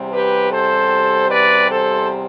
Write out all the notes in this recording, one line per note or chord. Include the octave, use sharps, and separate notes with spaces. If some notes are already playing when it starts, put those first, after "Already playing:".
Already playing: E2 C3 G3
G4 B4
A4 C5
B4 D5
A4 C5